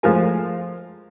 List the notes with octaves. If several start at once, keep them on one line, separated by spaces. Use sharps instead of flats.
F3 G#3 A3 F4 A#4 G#5